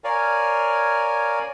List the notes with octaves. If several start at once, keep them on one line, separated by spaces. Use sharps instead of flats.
A#4 C#5 D5 F5 G#5